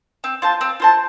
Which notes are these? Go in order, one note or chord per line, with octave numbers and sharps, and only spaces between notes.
C4
F4 C5 A5
C4
F4 C5 A5